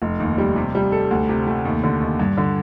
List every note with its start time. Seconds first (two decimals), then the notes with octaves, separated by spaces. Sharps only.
0.02 F1
0.20 D#2
0.38 G3
0.56 C3
0.75 G3
0.92 A4
1.11 D2
1.29 C3
1.47 A3
1.65 D#2
1.84 D3
2.01 D#2
2.19 G2
2.37 D3